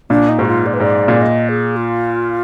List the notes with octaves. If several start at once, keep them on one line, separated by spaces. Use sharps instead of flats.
A#2 D4
D#4
G#2 F#4
F4
D5
B4
G#2 D5
A#2
D#5
G#4
F4